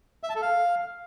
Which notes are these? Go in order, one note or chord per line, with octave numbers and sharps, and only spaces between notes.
E5
A5
A4
F5